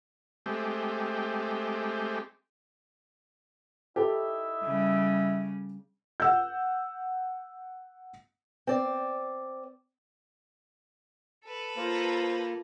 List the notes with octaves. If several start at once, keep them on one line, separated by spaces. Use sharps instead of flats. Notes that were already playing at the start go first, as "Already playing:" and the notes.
G#3 A3 C4 G4
D#4 E4 G4 A4 E5
C#3 G3
F#5 E6 G6
C4 D5
A4 B4
A#3 F4 C5 A#5